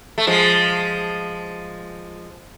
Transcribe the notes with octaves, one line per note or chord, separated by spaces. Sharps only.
A3
F3 G#3